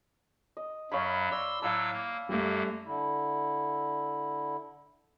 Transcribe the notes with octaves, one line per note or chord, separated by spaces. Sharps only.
D#5
F#2 F#3 C#5 F5 B5
D5 C6 E6
A2 F#3 E5 F5 A5 E6
A#3
F#2 G3 A3 A#3
D3 E4